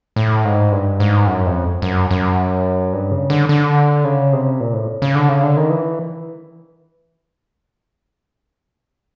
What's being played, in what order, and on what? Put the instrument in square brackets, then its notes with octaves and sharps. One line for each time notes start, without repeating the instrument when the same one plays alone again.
[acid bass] A2
G#2
G2
G#2
F#2
F2
F#2
F#2
G2
C#3
D3
D3
C#3
C3
A#2
A2
C#3
D3
C#3
D3
D#3
E3